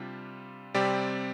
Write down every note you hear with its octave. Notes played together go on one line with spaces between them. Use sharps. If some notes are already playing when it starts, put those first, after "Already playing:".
Already playing: C3 G3 D4 F4
C3 G3 C4 G4 D5